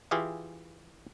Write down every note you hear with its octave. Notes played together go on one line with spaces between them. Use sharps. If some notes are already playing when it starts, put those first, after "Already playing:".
E3 F4 G4 G#4 E5 F5